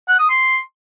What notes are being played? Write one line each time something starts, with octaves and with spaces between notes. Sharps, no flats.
F#5
D#6
C6